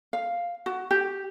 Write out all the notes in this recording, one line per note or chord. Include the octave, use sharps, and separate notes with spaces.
F5
F#4
G4